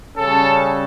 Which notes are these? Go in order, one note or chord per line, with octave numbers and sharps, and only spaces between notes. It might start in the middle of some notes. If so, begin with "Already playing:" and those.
C#3 G3 C#4 A4